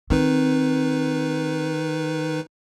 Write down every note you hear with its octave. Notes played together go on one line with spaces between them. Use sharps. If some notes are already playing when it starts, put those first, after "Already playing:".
D#3 C4 D#4 B4